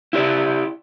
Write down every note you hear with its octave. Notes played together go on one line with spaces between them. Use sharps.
E4 G4 D5